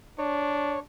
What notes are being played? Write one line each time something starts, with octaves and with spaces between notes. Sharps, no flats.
D4 C#5